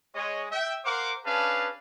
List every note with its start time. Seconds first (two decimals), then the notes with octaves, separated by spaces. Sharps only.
0.15 G#3 C#5 D#5
0.51 E5 G5
0.85 A#4 C5 F5 F#5 D6
1.25 C#4 D4 G#4 B4 F5 A5